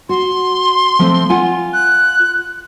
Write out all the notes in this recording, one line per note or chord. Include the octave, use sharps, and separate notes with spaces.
F#4 C6
F3 A3 C4
F4 F#5 G#5
F#6